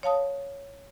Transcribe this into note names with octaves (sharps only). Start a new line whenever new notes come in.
C#5 F5 A5 D#6